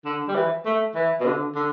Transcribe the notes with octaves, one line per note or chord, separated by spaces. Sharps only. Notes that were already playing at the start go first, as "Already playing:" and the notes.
D3
G3
E3
A3
E3
B2
D3
D3